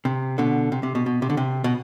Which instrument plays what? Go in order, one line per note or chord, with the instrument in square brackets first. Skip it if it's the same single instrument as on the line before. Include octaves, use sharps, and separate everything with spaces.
[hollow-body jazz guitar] C3
B2 D3
C3
C3
B2
B2
C3
D3
C3
B2